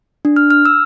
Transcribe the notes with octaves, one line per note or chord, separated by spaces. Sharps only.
D4
F6
F6
E6